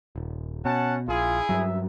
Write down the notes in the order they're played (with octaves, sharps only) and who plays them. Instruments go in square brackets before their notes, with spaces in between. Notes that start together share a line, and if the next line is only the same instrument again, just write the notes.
[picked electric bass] D#1
[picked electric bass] B2 [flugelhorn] C#4 [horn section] F#5 A5
[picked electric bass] A#1 [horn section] E4 G#4 [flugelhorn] F4
[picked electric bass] G2 F#3 [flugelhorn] E5